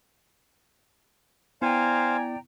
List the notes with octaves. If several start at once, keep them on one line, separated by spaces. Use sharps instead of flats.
B3 E4 C5 D5 F5 G5 G#5 A#5